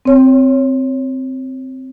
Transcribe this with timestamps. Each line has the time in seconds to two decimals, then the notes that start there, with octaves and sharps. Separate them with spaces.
0.05 C4 C#5